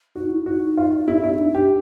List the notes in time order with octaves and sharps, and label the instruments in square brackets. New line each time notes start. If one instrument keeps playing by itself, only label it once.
[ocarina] D#4 [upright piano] F#4
[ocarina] E4
[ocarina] D#4 [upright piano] F#4
[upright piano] F4
E4
E4
[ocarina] D4
[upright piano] G4